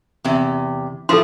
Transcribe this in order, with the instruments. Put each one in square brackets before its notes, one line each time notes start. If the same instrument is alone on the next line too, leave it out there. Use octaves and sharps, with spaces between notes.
[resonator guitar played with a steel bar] E2 C3
[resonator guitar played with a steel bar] A2 E3 F3 [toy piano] A4 C6